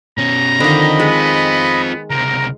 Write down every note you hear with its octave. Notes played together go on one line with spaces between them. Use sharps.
B2 C#4 A#5
D3 D#3 C4 F4 D#5 B5
G#3 B3
C#2 C3 A#4 A#5